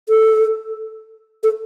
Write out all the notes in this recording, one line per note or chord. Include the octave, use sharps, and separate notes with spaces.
A4
A4